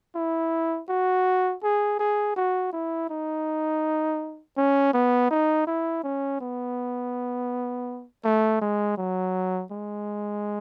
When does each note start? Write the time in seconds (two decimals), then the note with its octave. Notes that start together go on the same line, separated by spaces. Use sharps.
0.15 E4
0.89 F#4
1.63 G#4
1.99 G#4
2.36 F#4
2.73 E4
3.10 D#4
4.57 C#4
4.94 B3
5.31 D#4
5.67 E4
6.04 C#4
6.41 B3
8.25 A3
8.61 G#3
8.98 F#3
9.71 G#3